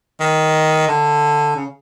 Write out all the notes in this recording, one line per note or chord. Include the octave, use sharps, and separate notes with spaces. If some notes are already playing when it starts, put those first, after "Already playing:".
D#3
D3
C#3